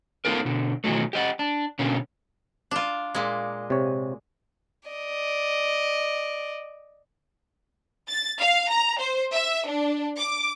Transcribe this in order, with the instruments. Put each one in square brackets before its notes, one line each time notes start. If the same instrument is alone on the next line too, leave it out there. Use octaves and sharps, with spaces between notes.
[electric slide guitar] B3 D#4 F4 A4 A#4
B2 D3
B2 D#3 E3 F#3 A3
G4 D#5 F#5
D4
B2 D3 A#3 C#4
[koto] D4 F4
A#2 G#3
[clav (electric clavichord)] C3 C#5
[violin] D5 D#5
[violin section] A6
F5
A#5
C5
E5
D4
D6